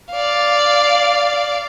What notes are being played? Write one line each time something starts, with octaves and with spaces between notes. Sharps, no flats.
D5 F5